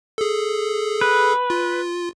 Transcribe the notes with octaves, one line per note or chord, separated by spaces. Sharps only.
G#4 A4
B4
F4